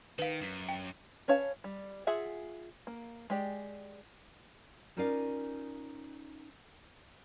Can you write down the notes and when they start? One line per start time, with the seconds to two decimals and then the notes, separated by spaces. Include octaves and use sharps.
0.19 D#3 B4 F5
0.41 F#2
0.69 G5
1.28 C#4 B4 C#5 F5 A5
1.64 G3
2.07 F4 G#4 E5 F#5 G#5
2.87 A#3
3.30 G#3 G4 D5
4.97 C#4 D#4 F4 A#4 D5 F5